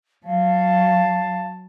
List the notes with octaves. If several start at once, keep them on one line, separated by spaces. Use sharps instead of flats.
F#3 F5 A5